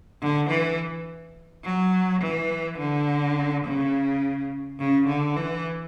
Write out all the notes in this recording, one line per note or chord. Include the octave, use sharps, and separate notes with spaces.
D3
E3
F#3
E3
D3
C#3
C#3
D3
E3